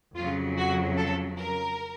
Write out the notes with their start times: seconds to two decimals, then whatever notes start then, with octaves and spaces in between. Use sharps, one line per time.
0.15 F2 C#3 F#3 F4
0.57 F#4
0.98 A4
1.40 A#4